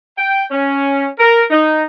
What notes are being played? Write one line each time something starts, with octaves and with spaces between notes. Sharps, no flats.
G5
C#4
A#4
D#4